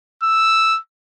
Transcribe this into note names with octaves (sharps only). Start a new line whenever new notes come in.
E6